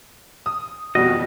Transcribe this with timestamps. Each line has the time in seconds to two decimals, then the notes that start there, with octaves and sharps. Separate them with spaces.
0.46 D#6
0.95 F2 B2 G3 F#4 D#5